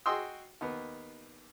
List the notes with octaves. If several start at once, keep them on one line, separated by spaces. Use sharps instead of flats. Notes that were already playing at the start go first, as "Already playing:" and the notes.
F#4 G#4 D#5 G5 C6 E6
D#2 B3